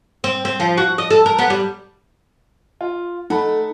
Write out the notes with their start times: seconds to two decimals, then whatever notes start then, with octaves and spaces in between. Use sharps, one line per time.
0.24 C4
0.45 C4
0.60 F3
0.78 F#4
0.98 D#5
1.10 A4
1.26 A#4
1.39 B3
1.50 G3
2.81 F4
3.30 A3 D#4 F#5 A5 B5